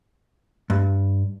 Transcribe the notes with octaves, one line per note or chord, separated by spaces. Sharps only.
G2